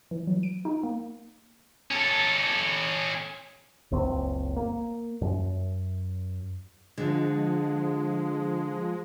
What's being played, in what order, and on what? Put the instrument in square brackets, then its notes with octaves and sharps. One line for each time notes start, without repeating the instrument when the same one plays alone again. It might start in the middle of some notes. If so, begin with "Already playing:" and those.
[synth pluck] E3
F#3
D7
D#4
A#3
[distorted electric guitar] C#4 A4
[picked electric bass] F#1 C#2 C4
A#3
F#2
[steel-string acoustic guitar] D3 [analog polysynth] F3 G#3